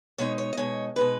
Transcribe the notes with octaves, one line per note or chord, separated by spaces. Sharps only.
B2 G#3 D#4 C#5
C#5
D#5
B2 G#3 D#4 C#5
B2 G#3 D#4 B4